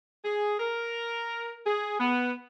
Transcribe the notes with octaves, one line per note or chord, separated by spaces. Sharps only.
G#4
A#4
G#4
B3